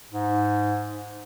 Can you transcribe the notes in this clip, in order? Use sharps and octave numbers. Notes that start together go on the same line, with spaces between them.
G#2